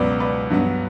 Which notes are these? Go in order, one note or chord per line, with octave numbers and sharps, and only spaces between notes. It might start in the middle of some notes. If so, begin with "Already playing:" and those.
Already playing: C#2 B2 F#3 B4 D5
B4 D5
G2 F#3 B3